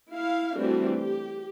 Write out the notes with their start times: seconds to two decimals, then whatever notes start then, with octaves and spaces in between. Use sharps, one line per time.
0.10 E4 F5
0.56 E3 G3 A3 C4 D4 F#4
0.94 G4